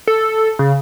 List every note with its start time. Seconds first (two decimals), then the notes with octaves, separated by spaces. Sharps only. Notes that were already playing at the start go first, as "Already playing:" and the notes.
0.07 A4
0.59 C#3